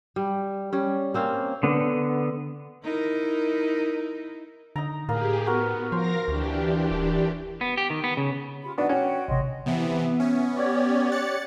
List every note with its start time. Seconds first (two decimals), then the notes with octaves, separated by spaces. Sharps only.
0.16 G3
0.73 G3 C#4
1.14 A#3 C4 C#4 F5
1.63 D3 B3
2.83 D#4 E4 A#4
4.76 D3 D#4 A#5
5.09 A2 A#3 G4 G#4
5.47 B3 F#4 A#4
5.92 F3 A#4 C5 F5 A#6
6.28 D2 E3 D4 G4
6.91 D#1
7.61 B3
7.78 G4
7.90 D#3
8.04 B3
8.17 C#3
8.63 F4 G4 B5
8.78 B3 D4 D#4 F#4
8.89 C#4 F#4 G5
9.28 A1 C3 C#5 D#5 C6
9.66 C3 E3 B3 E5
10.20 C#4
10.56 G4 C#5 D5
11.11 F#6 A6 C#7